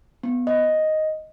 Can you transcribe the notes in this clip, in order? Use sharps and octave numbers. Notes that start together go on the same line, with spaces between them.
B3
D#5